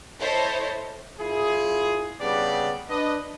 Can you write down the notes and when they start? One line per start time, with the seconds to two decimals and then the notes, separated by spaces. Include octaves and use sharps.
0.20 E4 A4 C5 C#5 D#5
1.19 F#2 E4 F4 G#4
2.20 C#3 G3 B3 D4 G4 D5
2.89 D4 B4 D#5